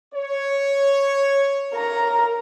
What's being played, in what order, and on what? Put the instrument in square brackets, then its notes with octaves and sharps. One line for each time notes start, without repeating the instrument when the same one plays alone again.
[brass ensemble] C#5
[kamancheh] A#4 A#5